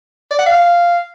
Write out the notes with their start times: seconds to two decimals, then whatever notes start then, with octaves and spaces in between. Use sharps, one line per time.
0.31 D5
0.39 F#5
0.47 F5